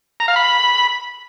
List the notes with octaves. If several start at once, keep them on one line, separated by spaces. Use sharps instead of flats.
A#5
F5
B5